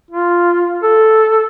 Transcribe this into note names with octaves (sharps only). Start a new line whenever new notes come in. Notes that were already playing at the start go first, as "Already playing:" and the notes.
F4
A4